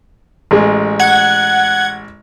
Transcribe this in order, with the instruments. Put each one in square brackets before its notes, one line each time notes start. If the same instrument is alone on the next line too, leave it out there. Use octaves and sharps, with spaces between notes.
[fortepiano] A1 G#3
[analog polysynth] F#5 G#6